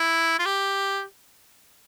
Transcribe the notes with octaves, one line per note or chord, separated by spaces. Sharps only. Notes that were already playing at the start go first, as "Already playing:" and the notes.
Already playing: E4
F4
G4